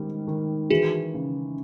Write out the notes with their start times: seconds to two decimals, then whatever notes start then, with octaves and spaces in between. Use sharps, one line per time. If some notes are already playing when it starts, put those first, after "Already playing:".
Already playing: G#2 D#3 G3
0.28 D#3
0.70 E3 F#4 G#4
1.14 C#3